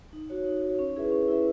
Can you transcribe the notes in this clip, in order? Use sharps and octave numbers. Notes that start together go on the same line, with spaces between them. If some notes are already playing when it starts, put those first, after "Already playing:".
D#4
F#4 C#5
D#4
F#4 C#5
C#4
E4 G#4 B4 E5
C#4
E4 G#4 B4 E5